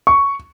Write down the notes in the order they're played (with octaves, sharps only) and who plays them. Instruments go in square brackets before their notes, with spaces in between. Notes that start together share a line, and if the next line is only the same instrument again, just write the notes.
[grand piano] C#6